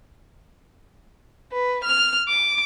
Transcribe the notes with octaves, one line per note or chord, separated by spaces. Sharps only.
B4
F6
D6